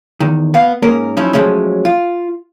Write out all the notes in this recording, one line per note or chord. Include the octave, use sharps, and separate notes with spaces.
E2 D#3
B3 F5
G#2 A#3 C#4 A#4
F3 F#3 C#4 D#4 E4
F3 F#3 G#3 A3 C#4
F4